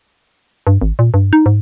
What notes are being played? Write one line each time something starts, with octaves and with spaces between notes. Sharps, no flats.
G2
G#1
A#2
G2
D#4
G#2